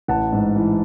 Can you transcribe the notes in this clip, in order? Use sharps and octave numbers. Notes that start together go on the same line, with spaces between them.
A1 F#5 A5
G#2
E3